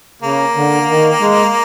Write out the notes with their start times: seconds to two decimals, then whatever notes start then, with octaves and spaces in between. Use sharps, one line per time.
0.22 C#3 A#3
0.56 D3
0.88 D#3
1.20 G#3